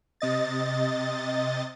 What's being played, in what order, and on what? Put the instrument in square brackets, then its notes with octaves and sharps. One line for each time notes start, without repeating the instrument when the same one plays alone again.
[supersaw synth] C3 D#5 A6